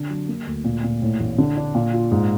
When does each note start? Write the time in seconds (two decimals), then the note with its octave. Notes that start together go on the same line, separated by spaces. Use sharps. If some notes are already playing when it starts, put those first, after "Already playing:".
Already playing: D3
0.10 F#3
0.28 A#3
0.47 D2
0.64 A#2
0.83 A#2
1.02 A2
1.20 A1
1.38 D3
1.57 D4
1.75 A#2
1.93 F4
2.11 G#2